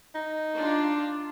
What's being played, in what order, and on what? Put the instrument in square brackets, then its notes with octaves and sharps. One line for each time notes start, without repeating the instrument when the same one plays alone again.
[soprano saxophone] D#4
[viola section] D4 F4